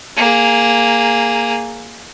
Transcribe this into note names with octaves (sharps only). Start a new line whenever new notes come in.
A#3 G#4